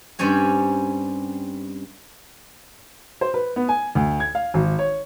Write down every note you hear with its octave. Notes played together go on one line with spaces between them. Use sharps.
G2 G3 C4 C#4 G#5
C5
B4
B3
G#5
D2
G#6
F5
G#1
C#5